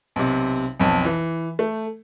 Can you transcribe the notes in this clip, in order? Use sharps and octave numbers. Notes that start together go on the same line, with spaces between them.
B1 C3
B1 F2
E3
A3